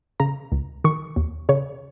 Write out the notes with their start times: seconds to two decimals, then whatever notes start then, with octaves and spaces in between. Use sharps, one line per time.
0.20 C#3 A#5
0.52 C#2
0.84 D#3 C#6
1.16 D#2
1.49 C#3 C#5